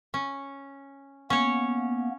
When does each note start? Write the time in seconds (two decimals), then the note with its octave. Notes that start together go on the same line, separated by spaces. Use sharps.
0.14 C#4
1.30 A#3 B3 C#4 C#5